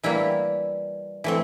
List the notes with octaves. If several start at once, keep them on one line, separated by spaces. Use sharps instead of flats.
E3 G3 A#3 E4
E3 A3 C4